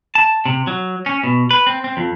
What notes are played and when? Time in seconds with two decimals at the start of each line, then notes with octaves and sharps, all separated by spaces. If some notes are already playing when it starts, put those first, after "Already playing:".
0.15 A5
0.46 C3
0.67 F#3
1.06 C#4
1.24 B2
1.51 B4
1.67 C4
1.84 C4
1.97 F2